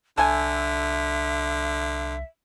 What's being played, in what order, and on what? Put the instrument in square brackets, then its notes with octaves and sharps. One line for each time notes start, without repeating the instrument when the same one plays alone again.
[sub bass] C2 [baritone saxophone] D3 [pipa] A4 G#5 [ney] E5